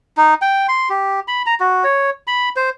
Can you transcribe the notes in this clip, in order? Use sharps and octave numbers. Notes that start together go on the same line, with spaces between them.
D#4
G5
C6
G4
B5
A#5
F#4
C#5
B5
C5